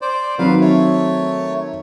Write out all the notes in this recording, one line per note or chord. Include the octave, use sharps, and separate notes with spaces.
C5 D5
D#3 F#3 C4 B4 F5
A3 C#5